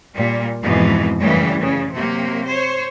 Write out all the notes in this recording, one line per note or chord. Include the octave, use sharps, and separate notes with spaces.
A#2 G3
F2 G#2 B2 E3
F#2 A2 C#3 E3 G3
C#3
C3 F#3 A#3
C5 C#5